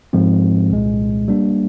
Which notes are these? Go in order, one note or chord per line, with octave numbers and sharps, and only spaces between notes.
G#2 F3 G#3 C4
C2 A#2 G#3
G3 A#3 D4